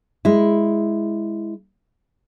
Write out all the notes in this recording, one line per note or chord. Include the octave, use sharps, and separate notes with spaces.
G#3 E4